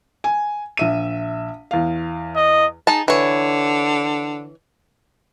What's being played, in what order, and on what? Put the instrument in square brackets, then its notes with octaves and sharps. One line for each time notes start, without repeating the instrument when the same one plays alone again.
[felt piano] G#5
A#1 E5 D#7
E2 F5
[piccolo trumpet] D#5
[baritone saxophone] D#4 [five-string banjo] G#4 A5
[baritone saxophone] D3 [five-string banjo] E3 C#5